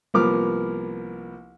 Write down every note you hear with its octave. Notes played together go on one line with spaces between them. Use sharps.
C2 F3 A#3 B3 D6 F6